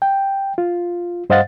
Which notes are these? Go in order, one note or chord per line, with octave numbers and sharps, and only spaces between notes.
G5
F4
G2 C5 D#5 F5 F#5 A6